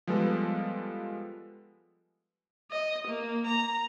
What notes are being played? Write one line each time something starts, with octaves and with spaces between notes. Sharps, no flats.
F3 G3 G#3 B3 A4 B4
D#5
A#3
A#5